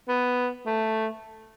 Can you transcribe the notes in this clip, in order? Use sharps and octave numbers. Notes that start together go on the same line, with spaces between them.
B3
A3